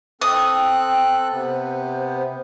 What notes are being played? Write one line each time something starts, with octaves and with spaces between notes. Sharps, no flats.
C4 A4 G5 D#6 F#6
C3 B3 C5